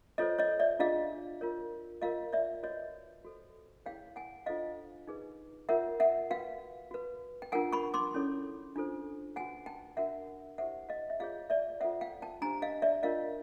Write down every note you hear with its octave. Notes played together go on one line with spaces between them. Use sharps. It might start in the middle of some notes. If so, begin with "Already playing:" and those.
F4 A4 C5 C#5 D#5
C#5 D#5
D5 E5
D4 F4 G#4 D#5 F5
F4 A#4 C#5
F4 A#4 C#5 D#5 F5
D5 E5
F#4 B4 C#5 D#5
F#4 A4 C5
E4 G#4 C#5 F5 G5
F#5 G#5
D4 F4 A4 C5 D#5 F5
D#4 G#4 B4
F4 A#4 C#5 E5 F#5
E5 F#5
F#4 B4 F5 G5
F#4 B4
G5
D4 F4 A#4 F#5 G#5
B5 C#6
C6 D6
C#4 E4 A4 C#5
D4 F4 A4 C5
F#4 B4 F#5 G#5
G5 A5
D4 F#4 A#4 E5 F#5
E4 G4 C5 E5 F#5
D#5 F5
E5
F4 G#4 C#5 D#5 F5
D5 E5
F4 A4 C5 E5 F#5
F5 G5
G5 A5
D4 G4 C5 G#5 A#5
D#5 F5
D5 E5
D4 F4 A#4 C#5 D#5 F5